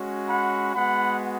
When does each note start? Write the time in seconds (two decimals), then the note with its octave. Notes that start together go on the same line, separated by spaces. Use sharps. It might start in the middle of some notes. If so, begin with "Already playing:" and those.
Already playing: G#3 C#4 F#4
0.29 F#5 B5
0.75 G#3 B3 F#4 F#5 B5